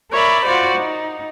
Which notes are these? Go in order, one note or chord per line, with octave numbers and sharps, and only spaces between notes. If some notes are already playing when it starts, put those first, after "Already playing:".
A#4 C#5 D5 E5 B5
F4 F#4 C5 D5
D#4